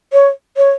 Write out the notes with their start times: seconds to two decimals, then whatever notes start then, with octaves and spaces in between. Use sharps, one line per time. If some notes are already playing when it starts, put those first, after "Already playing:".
0.13 C#5
0.57 C#5